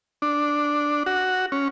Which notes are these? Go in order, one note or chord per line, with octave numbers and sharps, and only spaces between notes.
D4
F#4
C#4